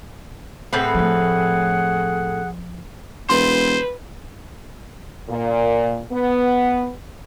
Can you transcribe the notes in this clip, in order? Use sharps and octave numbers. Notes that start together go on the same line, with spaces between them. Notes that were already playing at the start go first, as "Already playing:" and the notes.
A2 C4 G#4 B4 F#5 F#6
F3 A3
E1 B4 C5 C6
A#2
B3